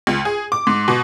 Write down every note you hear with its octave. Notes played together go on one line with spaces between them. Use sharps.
C#2
G#4
D6
G#2
B2